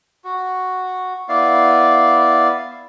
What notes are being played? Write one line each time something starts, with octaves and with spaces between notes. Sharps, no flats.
F#4
B3 E4 D5 F5